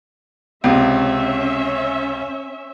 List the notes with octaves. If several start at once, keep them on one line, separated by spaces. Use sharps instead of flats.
C#2 C3 C#4 E5